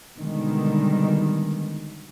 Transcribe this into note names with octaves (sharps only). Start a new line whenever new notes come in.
B2 D3 D#3 G3 G#3